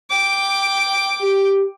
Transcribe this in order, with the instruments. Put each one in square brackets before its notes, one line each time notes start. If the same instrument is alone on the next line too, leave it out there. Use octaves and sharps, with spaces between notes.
[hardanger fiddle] G5 D6
[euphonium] G4